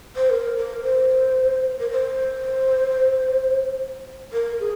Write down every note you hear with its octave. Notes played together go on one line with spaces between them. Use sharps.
C5
A#4
A#4
C5
A#4
C5
A#4
G#4